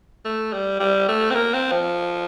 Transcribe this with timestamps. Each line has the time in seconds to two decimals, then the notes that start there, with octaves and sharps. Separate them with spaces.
0.25 A3
0.53 G3
0.80 G3
1.08 A3
1.31 C4
1.35 A#3
1.54 C4
1.72 F3